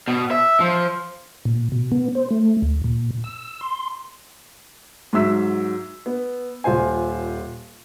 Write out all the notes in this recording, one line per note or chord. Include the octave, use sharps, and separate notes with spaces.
B2
E5
F3
A#2
B2
B3
C5
A3
D2
A#2
E6
C6
G#2 F#3 E5 E6 B6
B3
D#1 F4 C5 G#5